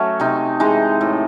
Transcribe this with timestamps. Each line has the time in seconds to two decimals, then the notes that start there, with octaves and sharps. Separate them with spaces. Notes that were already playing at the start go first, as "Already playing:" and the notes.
Already playing: F#3 A3 C#4
0.20 C3 D#4
0.60 E3 G#3 D#4
1.01 A2